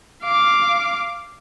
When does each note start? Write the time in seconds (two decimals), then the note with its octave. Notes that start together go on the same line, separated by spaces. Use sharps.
0.24 F5 D6